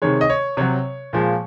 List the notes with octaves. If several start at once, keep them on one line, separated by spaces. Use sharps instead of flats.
C3 D#3 G#3 C#5
D#5
C#5
C3 F#3 C#5
A#2 F3 G#3